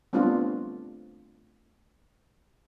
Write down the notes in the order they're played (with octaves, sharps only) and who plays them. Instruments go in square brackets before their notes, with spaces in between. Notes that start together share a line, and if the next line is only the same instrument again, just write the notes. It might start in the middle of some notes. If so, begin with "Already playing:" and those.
[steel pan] G3 A3 B3 C4 D4 F4